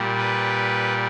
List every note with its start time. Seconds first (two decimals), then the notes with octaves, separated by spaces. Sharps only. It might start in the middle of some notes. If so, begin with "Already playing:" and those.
Already playing: A#2 G3
0.18 B4